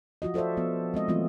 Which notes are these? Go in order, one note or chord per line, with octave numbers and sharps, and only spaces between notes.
F3 F4 F#4 D#5
F4 A4 C5 D5 E5
F3 B3
G#3 C4 D#5
E3 F#3 A3 B3 C4 F4